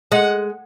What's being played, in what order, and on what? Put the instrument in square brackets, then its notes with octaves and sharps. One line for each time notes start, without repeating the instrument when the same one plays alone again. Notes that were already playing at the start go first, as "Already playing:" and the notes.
[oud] G#3 [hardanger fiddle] F#5